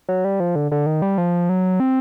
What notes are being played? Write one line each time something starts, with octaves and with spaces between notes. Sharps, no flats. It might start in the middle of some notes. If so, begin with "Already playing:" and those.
F#3
G3
F3
D3
D3
D#3
G3
F3
F#3
C4